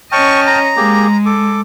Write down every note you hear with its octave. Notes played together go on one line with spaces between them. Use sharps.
C#4 D#5 G5 A5 C#6 F6
A#5
G#3 A#3 G4 G#4
A4 D6